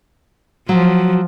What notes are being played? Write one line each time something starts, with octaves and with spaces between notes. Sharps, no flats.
F3 F#3